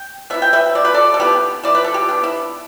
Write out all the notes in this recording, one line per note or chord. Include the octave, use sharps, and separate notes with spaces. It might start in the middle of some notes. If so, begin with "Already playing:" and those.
Already playing: G5
B3 E4 E5
G5
B4 E5
B2 D5
B4
A4 D5
A4
B3 E4 G4 B4
E3 D5
B4
A4
G4
B3 D4
E4